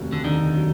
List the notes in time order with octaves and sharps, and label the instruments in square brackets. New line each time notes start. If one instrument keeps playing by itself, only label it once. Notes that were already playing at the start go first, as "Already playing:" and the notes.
Already playing: [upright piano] F1 D#2 F#3
[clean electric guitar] D3
[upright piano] D3 [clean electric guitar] D#3
[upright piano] F#3